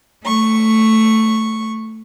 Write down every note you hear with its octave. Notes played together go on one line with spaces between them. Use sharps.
A3 C#6